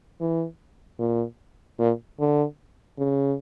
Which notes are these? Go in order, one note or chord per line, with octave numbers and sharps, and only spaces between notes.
E3
A#2
A#2
D3
C#3